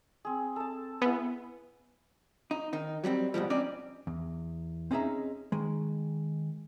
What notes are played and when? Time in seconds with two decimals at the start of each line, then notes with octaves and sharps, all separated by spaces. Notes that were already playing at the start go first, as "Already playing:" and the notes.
0.25 C4 G#4
0.56 A4 A5
1.02 B3 E4 G#4
2.51 D#4
2.73 D#3 D#4
3.04 F#3 G3 B3 C4
3.34 G#2 B2 F3 G3
3.50 C4 C#4 D#4 D5
4.07 E2
4.91 C4 C#4 D#4 G#4 E5 A#5
5.52 D#3 G#3